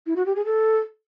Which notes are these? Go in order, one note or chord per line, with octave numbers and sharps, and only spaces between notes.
E4
F#4
G4
G#4
A4